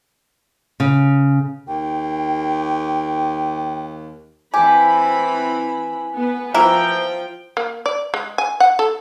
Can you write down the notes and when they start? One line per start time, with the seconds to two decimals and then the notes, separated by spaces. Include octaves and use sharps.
0.80 C#3
1.67 D#2 G5
4.54 E3 C4 G4 G#5 B5
6.16 B3 B4
6.54 E3 F3 E4 A#4 G5
7.57 A#3
7.86 D5
8.14 G#3
8.38 G#5
8.60 F#5
8.79 A4